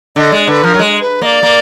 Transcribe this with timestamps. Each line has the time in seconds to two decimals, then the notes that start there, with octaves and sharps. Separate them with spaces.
0.16 D3 D#5
0.32 G#3 D5
0.47 D3 B4
0.64 F3 A#4
0.74 F#3
0.79 G#3
1.01 B4
1.21 A#3 D#5
1.26 D5
1.43 A#3